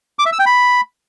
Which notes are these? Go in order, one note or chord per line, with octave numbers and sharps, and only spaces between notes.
D6
E5
E6
G5
B5